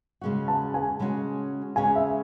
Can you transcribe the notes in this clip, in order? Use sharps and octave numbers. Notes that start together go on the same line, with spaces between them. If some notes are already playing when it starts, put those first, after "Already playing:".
C#3 G#3 C#4 F#4
A5
G#5
C#3 G#3 C#4 F#4
C#3 G#3 C#4 F#4 G#5
E5